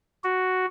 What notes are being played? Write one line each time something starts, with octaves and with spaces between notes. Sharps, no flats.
F#4